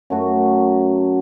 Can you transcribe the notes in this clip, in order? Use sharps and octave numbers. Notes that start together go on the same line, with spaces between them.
F#2 F#3 A3 F#4